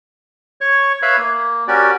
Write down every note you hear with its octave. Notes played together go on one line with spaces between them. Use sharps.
C#5 C#6
B4 C#5 E5 F5 B5
A#3
C#4 F#4 G4 A#4 D5